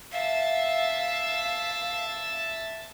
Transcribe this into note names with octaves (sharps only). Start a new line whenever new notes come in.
E5 F5 A5